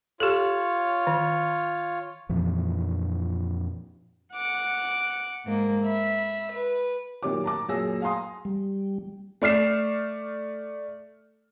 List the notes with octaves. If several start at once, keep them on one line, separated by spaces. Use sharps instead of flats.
F4 G4 A4 C#5
D#3
F2 A#2 E3 F3
F#5 D6 F#6
G#2 A#3
E5 B5
B4
F#2 A#2 D#3 G4 C#5 D6
A5 A#5 D6
F#2 A#2 G#4 C#5 E6 A#6
F5 G#5 A#5 C6 D#6
G3
A3 D5 F6 C7 E7